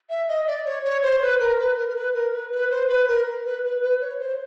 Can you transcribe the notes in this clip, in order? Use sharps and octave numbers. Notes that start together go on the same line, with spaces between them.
E5
D#5
D5
C#5
C#5
C5
B4
A#4
B4
A#4
A#4
B4
A#4
B4
B4
C5
B4
A#4
B4
B4
B4
C#5
C5